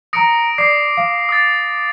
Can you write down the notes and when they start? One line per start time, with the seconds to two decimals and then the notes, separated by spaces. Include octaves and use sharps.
0.13 A#5 D#6 A#6 C#7 D7
0.58 D5 D6 C7
0.97 F5
1.29 D#6 A6